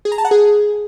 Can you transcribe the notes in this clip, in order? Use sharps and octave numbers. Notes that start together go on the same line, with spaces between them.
G#4
A#5
A5
F#5
G#4